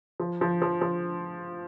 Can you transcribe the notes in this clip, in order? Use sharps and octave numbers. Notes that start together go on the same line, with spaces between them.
F3
F3
F3
F3